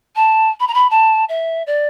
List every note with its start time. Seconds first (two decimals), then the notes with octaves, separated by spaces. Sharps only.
0.16 A5
0.60 B5
0.68 A#5
0.74 B5
0.90 A5
1.29 E5
1.67 D5